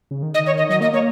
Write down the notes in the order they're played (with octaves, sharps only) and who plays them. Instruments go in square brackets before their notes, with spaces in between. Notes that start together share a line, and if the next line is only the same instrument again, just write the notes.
[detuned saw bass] C#3
D#3
[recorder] D#5
C#5
D#5
[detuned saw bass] F#3 [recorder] D#5
[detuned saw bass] A#3 [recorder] D#5
[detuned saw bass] A#3 [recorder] C#5